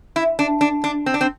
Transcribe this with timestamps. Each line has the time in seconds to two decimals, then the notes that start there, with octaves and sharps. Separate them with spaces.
0.16 E4
0.39 D4
0.61 D4
0.84 D4
1.06 C4
1.14 D4
1.21 C4